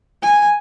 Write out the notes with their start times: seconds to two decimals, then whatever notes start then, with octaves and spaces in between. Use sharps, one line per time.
0.23 G#5